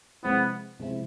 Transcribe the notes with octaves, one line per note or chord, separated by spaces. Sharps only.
C3 F3 G#3 B3 C4 E4
C3 F3 G#3 C4 E4